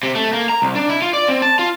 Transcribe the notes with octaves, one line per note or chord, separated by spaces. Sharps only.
C3
A3
A#3
A#5
C2
D4
E4
F4
D5
C4
A5
F4